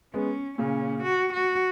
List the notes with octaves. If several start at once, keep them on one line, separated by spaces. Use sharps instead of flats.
G#3 B3 C#4
A#2 C#3 C#4
F#4
F#4